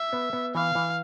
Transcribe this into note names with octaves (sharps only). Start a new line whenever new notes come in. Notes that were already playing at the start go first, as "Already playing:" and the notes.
Already playing: E5
B3
B3
E3 F5
E3